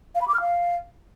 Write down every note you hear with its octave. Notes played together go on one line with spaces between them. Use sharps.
F5
B5
D6
F6
F5